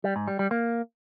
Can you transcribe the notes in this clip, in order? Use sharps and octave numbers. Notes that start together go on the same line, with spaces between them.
G3
G#2
G3
G3
A#3